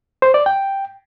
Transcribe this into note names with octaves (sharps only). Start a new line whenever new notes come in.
C5
D5
G5